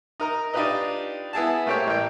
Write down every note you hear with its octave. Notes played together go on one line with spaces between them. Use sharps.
D#4 A#4 A#5
D4 D#4 F4 G4 B4 D#5
B3 E4 G#4 A5
A3 A#3 C4 G4 C#5 G5
A1 G5